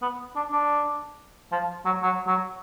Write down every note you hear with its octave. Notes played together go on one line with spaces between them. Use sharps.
B3
D4
D4
F3
F#3
F#3
F#3